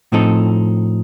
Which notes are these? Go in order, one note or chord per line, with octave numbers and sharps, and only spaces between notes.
A2 F3 C4 D#4 A4